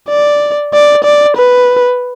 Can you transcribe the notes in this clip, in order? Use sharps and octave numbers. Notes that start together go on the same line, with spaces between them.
D5
D5
D5
B4